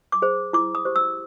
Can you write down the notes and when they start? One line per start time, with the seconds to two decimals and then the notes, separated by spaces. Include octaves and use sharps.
0.12 D6
0.22 G#4 C5
0.53 E4 D6
0.75 D#6
0.85 G4 C5
0.96 E6